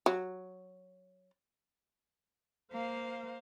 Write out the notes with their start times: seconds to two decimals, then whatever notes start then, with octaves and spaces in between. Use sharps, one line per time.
0.06 F#3
2.72 A#3 C5 F5